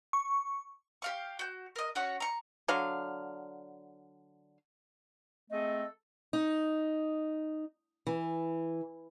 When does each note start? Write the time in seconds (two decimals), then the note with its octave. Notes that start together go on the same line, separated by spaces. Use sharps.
0.13 C#6
1.02 G4 F5 C#6
1.39 F#4 G6
1.76 A#4 D#5
1.95 C#4 F#4 C#5 F#5
2.20 A#5 C#6
2.68 D3 F#3 F5
5.51 G#3 A3 C4 A4 D#5
6.33 D#4
8.07 E3